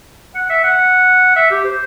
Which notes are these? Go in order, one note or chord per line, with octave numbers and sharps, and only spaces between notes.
F#5
E5
F#5
E5
G4
C5